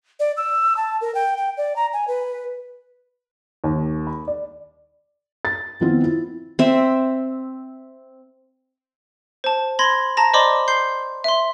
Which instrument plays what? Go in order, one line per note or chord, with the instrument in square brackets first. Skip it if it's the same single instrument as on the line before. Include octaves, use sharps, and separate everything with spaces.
[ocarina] D5
E6
A5
A#4
G5
G5
D5
A#5
G#5
B4
[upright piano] D#2
B5
D5
[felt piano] A6
D#3 F3 B3 C4 E4 F4
E4
[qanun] C4 E5
[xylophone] C5 A5
B5 C6 G#6 A#6
A5 A#5 A#6
C5 D5 D#5 B5 C6 D6
C6 G6 C7
E5 C6